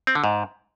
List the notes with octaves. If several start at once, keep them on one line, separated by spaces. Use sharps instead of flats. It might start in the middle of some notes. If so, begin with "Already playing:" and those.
C4
D3
G#2